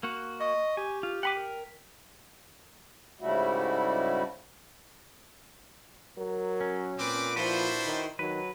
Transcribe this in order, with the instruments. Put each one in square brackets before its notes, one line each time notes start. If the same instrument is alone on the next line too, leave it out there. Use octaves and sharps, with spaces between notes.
[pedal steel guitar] A#3 F#4
[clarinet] D#5 [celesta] C#6
[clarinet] G4 [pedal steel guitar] G#5
[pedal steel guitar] F4
[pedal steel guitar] F#5 B5 D6 [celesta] G5 B6 D#7
[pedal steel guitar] A#4
[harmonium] G#2 C#3 G3 A3 E4 F#4
[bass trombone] F#3 [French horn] A#4
[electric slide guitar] C#4
[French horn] A#2 [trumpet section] C4 B4 D6
[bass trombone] F3 [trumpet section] D4 E4 C5 [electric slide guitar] F#4 B4
[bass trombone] D#3
[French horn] D#3 [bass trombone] F#3 [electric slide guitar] B4